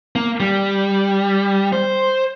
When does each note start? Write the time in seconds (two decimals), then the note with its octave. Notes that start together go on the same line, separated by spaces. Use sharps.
0.15 A#3
0.40 G3
1.73 C5